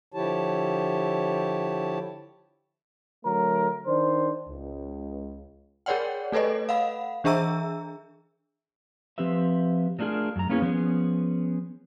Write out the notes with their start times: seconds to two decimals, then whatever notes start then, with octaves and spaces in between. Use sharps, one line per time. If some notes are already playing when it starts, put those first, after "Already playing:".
0.14 D3 F3 E4 G4 C#5 A5
3.24 D3 F#3 A3 A#4
3.86 D#3 D4 C5
4.49 C#2
5.86 G#4 A#4 C#5 D5 F#5 G5
6.32 A3 A4 B4 C#5 D#5
6.69 F5 F#5 B5
7.24 E3 D4 G#4 E5 A#5 E6
9.18 F3 C4 G4 B4 E5
9.99 F#3 A3 D4 F4 G#4 A#4
10.36 F#2 A#5
10.49 A#3 B3 C#4 E4 G#4
10.62 F3 B3 C#4 G#4